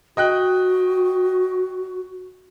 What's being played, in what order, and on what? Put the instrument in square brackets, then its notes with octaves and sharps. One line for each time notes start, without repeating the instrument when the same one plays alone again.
[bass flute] F#4 [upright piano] D#5 G5 F#6